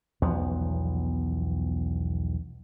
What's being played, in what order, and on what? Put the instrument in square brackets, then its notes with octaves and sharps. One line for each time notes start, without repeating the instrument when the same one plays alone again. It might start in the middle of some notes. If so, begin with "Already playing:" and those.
[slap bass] B1 E2 F3 B3